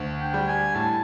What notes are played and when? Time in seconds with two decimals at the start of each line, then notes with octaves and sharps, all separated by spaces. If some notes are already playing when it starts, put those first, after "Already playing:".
Already playing: D2
0.20 G5
0.34 G3
0.48 G#5
0.75 A2 A5